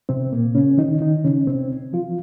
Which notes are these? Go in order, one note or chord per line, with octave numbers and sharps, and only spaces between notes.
C3 C4
A#2 A#3
C#3 C#4
D#3 D#4
D#3 D#4
C#3 C#4
C3 C4
F3 F4